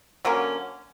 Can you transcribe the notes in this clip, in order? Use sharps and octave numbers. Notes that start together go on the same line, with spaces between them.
D3 F#3 A#3 C#4